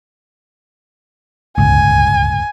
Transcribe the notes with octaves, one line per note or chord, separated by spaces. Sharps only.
D1 G1 C#2 G#5